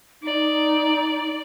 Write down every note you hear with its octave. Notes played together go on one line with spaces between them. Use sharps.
D#4 D5